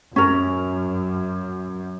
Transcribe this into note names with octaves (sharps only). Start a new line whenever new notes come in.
F#2 C#4 A#4